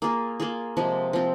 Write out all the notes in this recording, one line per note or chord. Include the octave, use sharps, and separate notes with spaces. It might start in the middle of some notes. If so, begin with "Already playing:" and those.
A#3 F4 G#4
A#3 F4 G#4
C3 F3 G#3
F3 C4 F4